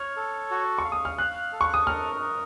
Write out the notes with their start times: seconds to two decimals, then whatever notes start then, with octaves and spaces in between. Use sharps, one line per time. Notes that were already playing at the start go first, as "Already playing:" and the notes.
Already playing: C#5 F6
0.16 A4
0.51 F#4
0.78 C#6
0.85 F5
0.92 D#6
1.05 F6
1.18 F5 F#6
1.53 A4
1.61 C#6
1.74 D#6
1.87 A#4 F6
2.21 A#4